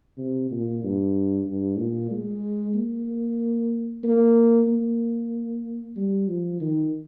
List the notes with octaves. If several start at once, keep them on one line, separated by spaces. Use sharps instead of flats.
C3
A#2
G2
G2
A#2
G#3
A#3
A#3
A#3
G3
F3
D#3